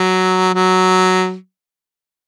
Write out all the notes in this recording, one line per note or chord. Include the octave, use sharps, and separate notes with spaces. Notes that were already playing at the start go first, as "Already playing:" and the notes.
Already playing: F#3
F#3